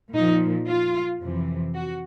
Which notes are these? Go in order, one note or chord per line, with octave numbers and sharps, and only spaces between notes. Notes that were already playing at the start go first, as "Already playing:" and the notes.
A#2 F3 D#4
F4
F2 C3 E3
F#4